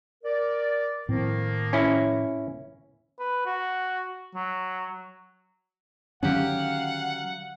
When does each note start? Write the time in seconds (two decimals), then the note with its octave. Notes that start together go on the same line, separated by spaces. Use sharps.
0.24 A#4 D5
1.09 A2 D#3 F3 A#3 C4
1.73 C#4 E4
3.20 B4
3.46 F#4
4.35 F#3
6.23 D3 D#3 F#3 C#4 G4 F5 F#5